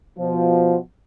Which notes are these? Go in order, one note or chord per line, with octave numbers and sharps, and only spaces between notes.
B2 F3